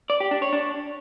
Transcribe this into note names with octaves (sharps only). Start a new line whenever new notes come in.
D5
G4
D4
C#5
D4